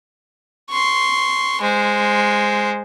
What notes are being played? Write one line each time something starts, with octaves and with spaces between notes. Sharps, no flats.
C6 C#6
G#3 C5